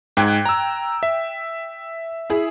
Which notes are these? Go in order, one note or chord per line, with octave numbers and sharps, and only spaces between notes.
G#2 G5 F#6 G#6
A#5 E6
E5
E4 G#4